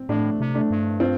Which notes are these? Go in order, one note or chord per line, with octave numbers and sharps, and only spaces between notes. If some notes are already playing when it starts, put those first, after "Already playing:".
Already playing: C4
A2 A3 D4
C3
A3 D4
G2
C4 F4